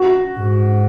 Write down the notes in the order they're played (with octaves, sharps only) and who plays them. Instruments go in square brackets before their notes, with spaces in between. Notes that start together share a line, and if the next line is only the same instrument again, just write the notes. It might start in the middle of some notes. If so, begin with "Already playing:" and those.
Already playing: [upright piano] F#4
[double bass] G#2